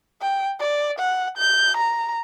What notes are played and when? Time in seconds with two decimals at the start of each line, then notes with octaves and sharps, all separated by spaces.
0.21 G5
0.59 D5
0.99 F#5
1.37 G6
1.77 A#5